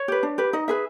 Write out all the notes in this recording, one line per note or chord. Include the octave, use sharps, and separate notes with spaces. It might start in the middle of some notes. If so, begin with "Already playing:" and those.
Already playing: C#5
G4 B4
D4
G4 B4
D#4 D#5
G#4 B4 E5